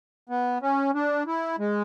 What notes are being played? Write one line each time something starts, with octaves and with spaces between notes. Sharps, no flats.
B3
C#4
D4
E4
G#3